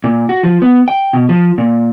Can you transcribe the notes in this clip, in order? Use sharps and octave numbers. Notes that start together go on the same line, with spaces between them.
A#2
F#4
F3
B3
G5
B2
F3
A#2